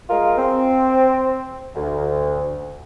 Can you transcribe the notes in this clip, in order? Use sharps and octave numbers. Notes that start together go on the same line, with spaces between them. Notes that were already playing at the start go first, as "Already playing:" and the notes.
G#3 F4 A#4
C4
D2